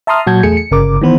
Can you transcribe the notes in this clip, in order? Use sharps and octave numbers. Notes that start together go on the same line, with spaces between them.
E5 A5 A#5 C6 D#6 F6
A#2 F#3 F#4 A5 G6 G#6
E2 A3 G#4 C#7
C#7
G1 C#3 A#4 D6
D#3 E3 B3 B4 C5